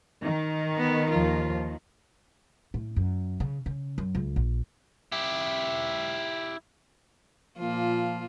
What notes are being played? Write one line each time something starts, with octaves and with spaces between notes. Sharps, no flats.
D#3
B3
D#2 F3 F4
A2
F#2
C#3
C#3
F#2
C#2
A#1
E4 G4
A#2 F3 A#3 F4